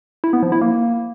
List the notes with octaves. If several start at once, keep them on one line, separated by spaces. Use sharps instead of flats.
E4
B3
F3
E4
A#3